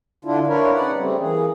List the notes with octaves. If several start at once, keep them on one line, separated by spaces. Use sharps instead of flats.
D3 D4 E4 F4
D4 E4 F4 A#4 B4 C#5
C#3 D#4 B4 D5 F#5
C#3 G3 A3 C4
E3 A#3 G#4